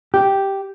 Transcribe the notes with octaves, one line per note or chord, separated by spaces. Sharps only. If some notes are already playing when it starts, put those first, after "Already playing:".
G4